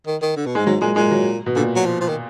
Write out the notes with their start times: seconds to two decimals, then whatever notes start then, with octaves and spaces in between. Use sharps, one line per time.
0.06 D#3
0.22 D#3
0.36 D3
0.46 B2
0.55 G#2 G#3
0.66 G#2 F#3
0.81 A#2 G#3
0.96 A#2 G#3
1.11 F#3
1.46 B2
1.56 A#2 D3
1.76 F#3
1.86 F3
2.01 F3
2.08 D#3